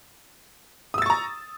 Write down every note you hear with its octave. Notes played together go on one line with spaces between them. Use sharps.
A#5 C#6 D#6 E6 A6